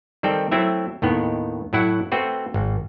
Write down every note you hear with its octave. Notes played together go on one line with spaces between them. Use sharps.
D#3 G3 C4 A4 G5
F#3 A3 C4 E4 E5
D#2 A2 D#3 B3
A2 F#3 E4 F#5
A3 C4 F#4 B4 C5
G#1